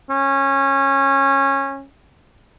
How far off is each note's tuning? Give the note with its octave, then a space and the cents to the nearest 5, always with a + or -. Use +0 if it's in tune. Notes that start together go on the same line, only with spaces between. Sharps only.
C#4 -20